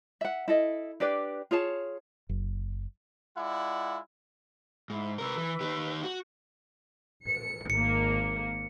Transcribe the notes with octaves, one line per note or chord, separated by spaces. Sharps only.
E5 F#5
E4 A4 D#5
D4 G4 B4 D5
F4 G#4 C#5 A5
F#1
G#3 E4 F4 D5 F#5
G#2 E4 B5
C3 A#4 B4 E6
E3
D#3 G4
F#4
C#7
G#1 A#3 C#7